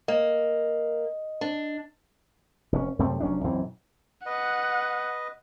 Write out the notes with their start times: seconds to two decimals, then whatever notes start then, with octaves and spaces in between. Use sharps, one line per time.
0.08 A#3 D#5
1.41 D4
2.72 F1 G#2 C#4
2.99 F#2 C3 A3 C4
3.20 F1 F#3 C#4 D4
3.44 B1 F#2 E3 C4
4.26 B4 D#5 F#5